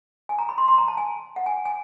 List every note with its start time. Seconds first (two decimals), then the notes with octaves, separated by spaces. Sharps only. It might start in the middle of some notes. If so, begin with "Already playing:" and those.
0.29 G#5
0.39 A#5
0.49 B5
0.58 C6
0.68 C6
0.78 A#5
0.88 A5
0.97 G#5
1.36 F#5
1.46 G#5
1.65 G#5